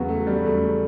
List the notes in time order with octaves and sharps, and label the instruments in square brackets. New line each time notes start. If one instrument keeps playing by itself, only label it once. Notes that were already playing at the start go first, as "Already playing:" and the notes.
Already playing: [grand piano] E2 C#3 F#3 [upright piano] B3 F#4
[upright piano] A3
G3
[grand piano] E2 C#3 F#3 [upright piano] A3